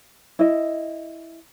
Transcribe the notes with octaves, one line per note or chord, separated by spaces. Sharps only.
E4 D#5